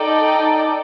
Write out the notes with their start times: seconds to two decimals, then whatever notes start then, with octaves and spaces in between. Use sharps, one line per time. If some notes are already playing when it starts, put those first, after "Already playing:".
Already playing: D#4 A4 D5 G5